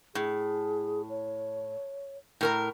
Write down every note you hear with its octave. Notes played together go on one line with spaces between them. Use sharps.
A2 G#4
C#5
A2 A#4 A#5